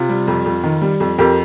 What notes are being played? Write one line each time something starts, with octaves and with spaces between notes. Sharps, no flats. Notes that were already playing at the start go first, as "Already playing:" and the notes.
Already playing: C3 F4
G3
F2
F2
D#3
G3
F2
F2 G4 A#4